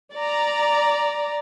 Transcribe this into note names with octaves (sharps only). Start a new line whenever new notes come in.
D5 A#5